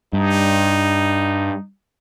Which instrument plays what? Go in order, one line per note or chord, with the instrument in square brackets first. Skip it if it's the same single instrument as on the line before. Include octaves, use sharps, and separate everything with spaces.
[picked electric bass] G2 [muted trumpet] D#4